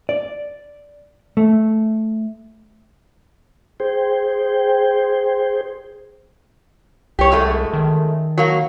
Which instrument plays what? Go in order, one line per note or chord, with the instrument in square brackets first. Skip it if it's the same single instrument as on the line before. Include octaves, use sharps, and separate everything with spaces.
[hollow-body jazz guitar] D5
A3
[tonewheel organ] G#4 C5 G5
[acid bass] C2 [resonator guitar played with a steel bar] G4 C#5
[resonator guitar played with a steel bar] F#2 G#3 A3
[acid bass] D#3
[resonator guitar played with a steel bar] F#3 A#3